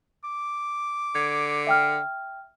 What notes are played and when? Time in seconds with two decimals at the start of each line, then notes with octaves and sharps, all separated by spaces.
0.24 D6
1.15 D3 G#6
1.67 E5 G5 F6